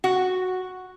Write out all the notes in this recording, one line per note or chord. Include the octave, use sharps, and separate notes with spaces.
F#4